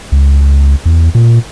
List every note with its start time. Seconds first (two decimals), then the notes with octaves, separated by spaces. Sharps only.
0.12 C#2
0.41 C#2
0.86 E2
1.15 A#2